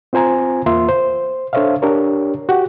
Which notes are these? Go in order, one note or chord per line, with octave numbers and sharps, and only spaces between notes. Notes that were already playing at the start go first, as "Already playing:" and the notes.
C4 F4 C5 G#5 A#5
E2 A#3 F4 E5 C6
C5
D4 A4 C5 C#5 E5 F5
D4 G4 A#4 C#5
F#4 G4 F#5